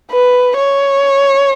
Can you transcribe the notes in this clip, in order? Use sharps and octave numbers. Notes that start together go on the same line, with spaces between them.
B4
C#5